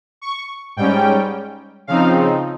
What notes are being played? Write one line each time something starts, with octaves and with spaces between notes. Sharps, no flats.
C#6
G#2 G3 C#4 G5
C#3 F3 C4 D#4 F5